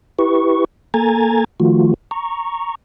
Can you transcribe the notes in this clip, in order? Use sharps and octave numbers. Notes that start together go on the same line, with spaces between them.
E4 G4 B4 C#6
A#3 A4 G#5 A#5 G#6 A6
D#3 F3 A3 F4 F#4
A#5 C#6